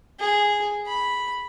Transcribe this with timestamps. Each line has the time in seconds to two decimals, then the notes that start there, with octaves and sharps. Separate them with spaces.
0.20 G#4
0.87 B5